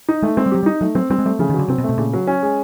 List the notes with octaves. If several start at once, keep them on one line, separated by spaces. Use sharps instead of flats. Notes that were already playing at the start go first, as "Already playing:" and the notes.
D#4
G#3 A3
G#3 C4
G3
F#3 G4
G3
D#4
F#3 A3
F#3 C4
G3 C4
G#3
G3 A3
C#3 F3
D#3
D3 F#3
C3 C4
B2
A3
B2
A#2 C#3
F#3
C#4
G#3